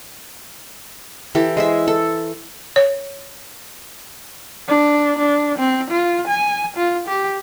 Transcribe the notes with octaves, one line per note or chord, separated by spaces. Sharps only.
E3 G4 A4
G#3 C5 E5
A4
C#5
D4
D4
C4
F4
G#5
F4
G4